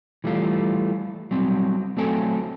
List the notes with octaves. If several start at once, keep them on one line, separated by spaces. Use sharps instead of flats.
E3 G3 A3 F4
F#3 G3 C4
F#3 A3 C4 A4 G5 G#5